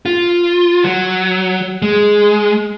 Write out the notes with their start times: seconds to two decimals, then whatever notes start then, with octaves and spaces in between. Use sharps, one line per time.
0.06 F4
0.84 F#3
1.82 G#3